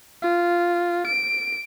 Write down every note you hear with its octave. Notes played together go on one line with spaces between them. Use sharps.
F4
D7